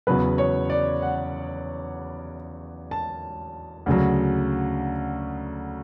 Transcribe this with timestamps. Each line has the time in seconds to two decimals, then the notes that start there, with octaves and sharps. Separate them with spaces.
0.07 E2 C#3 F#3 B3 B4
0.38 C#5
0.70 D5
1.02 F#5
2.91 A5
3.86 D2 C#3 F#3